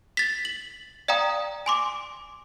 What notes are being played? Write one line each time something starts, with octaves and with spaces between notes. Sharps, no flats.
A6 B6
F#7
D5 F5 G5 A#5 D#6
G#5 C6 D6